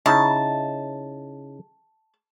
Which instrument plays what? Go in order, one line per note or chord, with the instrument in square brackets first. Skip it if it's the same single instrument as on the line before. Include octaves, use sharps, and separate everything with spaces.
[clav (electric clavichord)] C#3 D#4 E4 [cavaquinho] A5